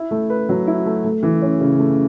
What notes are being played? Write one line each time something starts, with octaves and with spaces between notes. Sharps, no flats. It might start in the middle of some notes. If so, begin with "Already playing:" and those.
Already playing: E4
A3
B4
F#3
E4
A3
A3
E3
C#4
C#3
A3